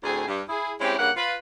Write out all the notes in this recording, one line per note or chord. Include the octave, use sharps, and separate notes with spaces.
D2 A2 C4 G#4
G2
E4 G#4
G#3 C4 C#4 E4 G4
G2 C#3 A#3 F#5
F4 B4